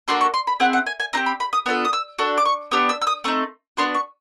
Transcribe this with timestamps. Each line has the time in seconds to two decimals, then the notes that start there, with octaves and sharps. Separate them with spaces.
0.08 A#3 D4 F#4 A4 C6
0.21 C#6
0.34 C6
0.47 B5
0.60 C4 E4 G#4 F#5
0.73 F#5
0.86 G#5
1.00 G#5
1.13 C4 D#4 A#5
1.17 G4
1.26 B5
1.40 B5
1.53 D#6
1.66 B3 D4 F4 A4
1.85 D#6
1.93 E6
2.18 D4 F#4 A4
2.38 D6
2.45 C#6
2.71 B3 D4 G4 E6
2.89 E6
3.02 E6
3.07 D#6
3.24 A3 C4 D#4 C#6
3.77 B3 D4 F#4 C6
3.95 C#6